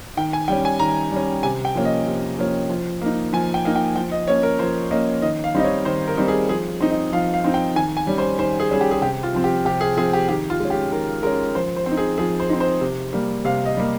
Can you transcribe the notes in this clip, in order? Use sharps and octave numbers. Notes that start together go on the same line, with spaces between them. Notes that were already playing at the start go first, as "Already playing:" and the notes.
D#3 G5
G#5
G3 C#4 G5
G#5
D#3 A#5
G3 C#4
C3 G#5
G5
F3 A#3 C#4
D#5
C3
F3 A#3 C#4
F3
A#3 D#4
F3 G#5
G5
A#3 D#4
G5
F3 G5
D#5
A#3 C#4 C#5
A#4
F3 C5
A#3 C#4 D#5
D#3 D#5
F5
G3 C4 D#4 D#5
C#5
D#3 C5
A#4
G3 C4 D#4
G#4
F3 G#4
C4 D#4
D#5
F3 F5
F5
C4 D#4
G5
D#3 G#5
G#5
G3 C#4
C5
D#3 C5
G#4
G3 C#4 G#4
G4
G#4
C3 G4
F4
F3 C4
G4
C3 G4
G#4
F3 C4 G#4
G4
D#3 G4
F4
G#3 C#4
G4
D#3 A#4
G#3 C#4 A#4
F3 C5
C5
C4
D#4
G#4
F3 G#4
C5
C4 D#4
C5
C3
G3 A#3
C3 F5
D#5
G3 A#3